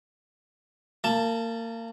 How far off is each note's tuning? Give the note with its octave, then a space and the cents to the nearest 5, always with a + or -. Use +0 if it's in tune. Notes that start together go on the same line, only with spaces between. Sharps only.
A#3 -30 A5 +0